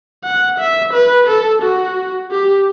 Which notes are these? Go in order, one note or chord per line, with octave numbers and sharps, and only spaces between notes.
F#5
E5
B4
A4
F#4
G4